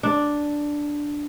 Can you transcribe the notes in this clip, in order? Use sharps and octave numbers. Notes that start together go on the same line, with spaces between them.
D4